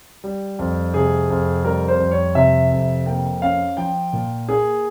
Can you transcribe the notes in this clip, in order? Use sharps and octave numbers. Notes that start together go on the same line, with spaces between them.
G3
F2
C3 G#4
F2
G3 A#4
C5
F2
C#5
C3 E5
F2
A#3 G5
C#4 F5
F3 G5
A#2
A#3 G#4